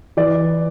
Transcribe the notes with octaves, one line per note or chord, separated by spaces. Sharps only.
E3 D5